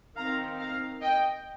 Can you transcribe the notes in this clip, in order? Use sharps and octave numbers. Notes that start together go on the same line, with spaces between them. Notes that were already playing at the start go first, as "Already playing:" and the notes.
D#3 C4 F5 A#5
F5 A#5
D#5 G5